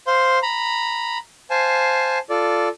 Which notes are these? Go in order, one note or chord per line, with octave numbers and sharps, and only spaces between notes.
C5 F5 C6
A#5 B5
C5 F5 G#5 A5
F4 A4 D5